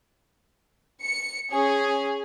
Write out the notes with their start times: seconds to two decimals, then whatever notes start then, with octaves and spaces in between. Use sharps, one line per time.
1.03 C#7
1.51 C#4 G#4